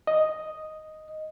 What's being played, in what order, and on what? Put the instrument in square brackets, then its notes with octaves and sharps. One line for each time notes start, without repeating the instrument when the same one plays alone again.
[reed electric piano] D#5